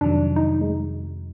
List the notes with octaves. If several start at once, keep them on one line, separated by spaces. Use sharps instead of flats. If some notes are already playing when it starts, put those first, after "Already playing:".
F2 C3 D#3 F#3 D4
D#4
G#3